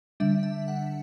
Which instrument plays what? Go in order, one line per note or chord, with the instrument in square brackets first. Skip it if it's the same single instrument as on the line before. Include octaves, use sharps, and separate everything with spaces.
[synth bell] D3 G3 D4 E5
E5
F#5